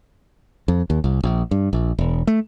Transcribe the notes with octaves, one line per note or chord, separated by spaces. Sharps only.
F2
D#2
C2
A#1
G2
A#1
E1
A3